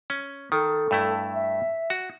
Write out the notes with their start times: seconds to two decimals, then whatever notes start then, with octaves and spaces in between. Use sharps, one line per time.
0.10 C#4
0.52 D#3 A4
0.91 G2 A3 E4
1.34 E5
1.90 F#4